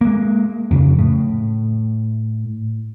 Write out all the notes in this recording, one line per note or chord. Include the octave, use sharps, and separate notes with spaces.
G#3 A#3
F2 C#3
A2